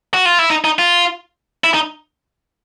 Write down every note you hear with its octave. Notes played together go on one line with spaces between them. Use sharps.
F#4
F4
E4
D#4
D#4
F4
E4
D#4